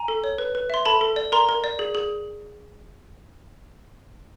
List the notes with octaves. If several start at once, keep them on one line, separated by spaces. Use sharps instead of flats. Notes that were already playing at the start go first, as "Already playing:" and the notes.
Already playing: G#5 A#5
A4
C#5
B4
B4
E5 C6
A4 A5 B5
A4
D5
A#4 A#5 C6
A#4
D5
G#4
G#4